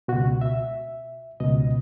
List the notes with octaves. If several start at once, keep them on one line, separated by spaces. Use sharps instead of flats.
C#2 B2 F#4
E5
C#2 B2 D#5